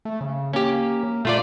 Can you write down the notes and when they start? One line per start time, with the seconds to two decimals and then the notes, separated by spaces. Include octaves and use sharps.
0.05 A3
0.21 C#3
0.53 A#3 C#4 G4
1.25 A#2 A3 F4 D5